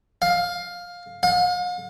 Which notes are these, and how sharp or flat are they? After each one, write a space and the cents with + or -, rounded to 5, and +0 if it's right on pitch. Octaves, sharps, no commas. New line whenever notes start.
F5 +15
F5 +45